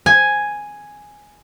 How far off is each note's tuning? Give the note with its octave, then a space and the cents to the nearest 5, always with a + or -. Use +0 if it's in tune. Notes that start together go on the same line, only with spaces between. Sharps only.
G#5 +0